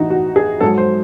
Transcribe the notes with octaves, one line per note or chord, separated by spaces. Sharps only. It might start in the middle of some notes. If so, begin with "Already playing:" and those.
Already playing: A2 E3 D#4 F#4
F#4
G#4
G#2 F#3 A4
C5